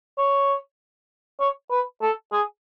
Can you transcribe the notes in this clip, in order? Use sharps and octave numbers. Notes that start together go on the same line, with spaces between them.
C#5
C#5
B4
A4
G#4